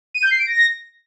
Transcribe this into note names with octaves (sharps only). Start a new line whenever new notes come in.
D#7
G6
C7
D7
A#6